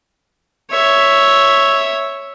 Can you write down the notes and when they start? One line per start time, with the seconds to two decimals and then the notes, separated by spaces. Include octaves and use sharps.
0.70 C#5 E5